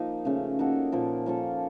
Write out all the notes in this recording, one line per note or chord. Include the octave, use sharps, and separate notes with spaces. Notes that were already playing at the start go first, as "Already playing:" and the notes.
Already playing: F3 A#3 D#4
C#3 A3 C#4
A#3 D#4 F#4 A4
A#2 F3 A#3
F3 A#3 C#4 A4